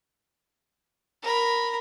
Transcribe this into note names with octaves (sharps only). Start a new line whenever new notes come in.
A#4 B5